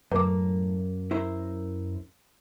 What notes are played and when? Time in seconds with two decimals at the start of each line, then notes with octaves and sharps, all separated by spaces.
0.12 F#2 A2 A#3 B4 D6
1.11 E4 A#4 C5